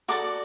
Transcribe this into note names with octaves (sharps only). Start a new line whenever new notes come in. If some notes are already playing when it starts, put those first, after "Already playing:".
F#4 A4 D5 D6